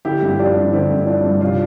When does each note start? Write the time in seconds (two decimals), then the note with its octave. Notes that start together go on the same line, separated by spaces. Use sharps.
0.05 D3 E4 G4
0.22 G2
0.28 G4
0.39 F3 D4 F4
0.56 G2
0.73 D3 C4 E4
0.91 G2
0.99 E4
1.06 F3 D4
1.25 G2
1.41 C3 D4 F4